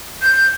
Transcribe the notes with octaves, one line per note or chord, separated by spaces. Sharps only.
G6